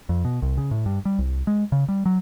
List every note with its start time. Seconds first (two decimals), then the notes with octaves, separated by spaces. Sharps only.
0.09 F2
0.25 B2
0.42 C2
0.58 C#3
0.71 A2
0.86 G2
1.05 G3
1.19 C2
1.47 G#3
1.72 C#3
1.89 G3
2.06 F#3